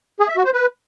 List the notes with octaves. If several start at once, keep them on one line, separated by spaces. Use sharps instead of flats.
G#4
E5
F#4
C5
B4